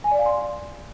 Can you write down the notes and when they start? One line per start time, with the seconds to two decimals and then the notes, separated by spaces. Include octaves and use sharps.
0.04 G#5
0.11 D5
0.19 F5
0.26 C6